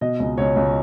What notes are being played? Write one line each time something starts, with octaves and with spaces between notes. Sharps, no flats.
B2 D#5
C#2
C#2 C#5
C#2